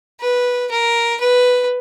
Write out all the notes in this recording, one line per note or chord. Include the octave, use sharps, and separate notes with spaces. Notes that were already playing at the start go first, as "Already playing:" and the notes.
B4
A#4
B4